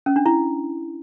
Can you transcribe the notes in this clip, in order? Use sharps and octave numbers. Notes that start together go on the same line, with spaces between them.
C#4
D4
E4